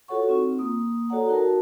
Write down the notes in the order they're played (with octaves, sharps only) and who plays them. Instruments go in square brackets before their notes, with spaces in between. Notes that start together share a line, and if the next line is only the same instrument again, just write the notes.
[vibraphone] F4 F#4 A4 C#5 F#5 C#6
C4 D#4 F4
A#3 D#6
F#4 A4 C#5 D5 F#5 A#5
D#4 F#4 A#4 A5